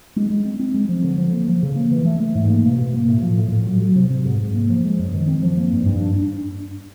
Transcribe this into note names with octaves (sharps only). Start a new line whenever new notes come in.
G#3
G#3
C4
C4
G#3
F3
D3
F3
A#3
F3
C#3
A#3
E3
A3
A3
G#2
A#3
B2
B2
A#3
A2
F3
A2
A2
F#3
F#3
C3
C3
G#2
G#2
A#3
F3
G#3
F#2
D#3
C4
F3
A#3
G2
G2
D4
D4